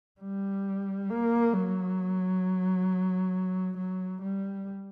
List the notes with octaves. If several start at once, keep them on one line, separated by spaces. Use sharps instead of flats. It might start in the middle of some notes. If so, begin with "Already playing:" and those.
G3
A#3
F#3
F#3
G3